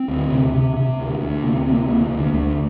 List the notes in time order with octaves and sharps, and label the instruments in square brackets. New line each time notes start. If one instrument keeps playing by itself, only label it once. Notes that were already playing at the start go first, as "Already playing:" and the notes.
Already playing: [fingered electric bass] C4
D2
C3
C3
C3
D2
D2
C3 A#3
C4
C3 A#3
D2 A#3
D2
D2 A3